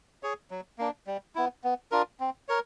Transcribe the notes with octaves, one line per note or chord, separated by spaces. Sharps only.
G#4 C#5
F#3
A#3 D4
G3
B3 E4
B3
D4 F4 A#4
C4
A#4 C#5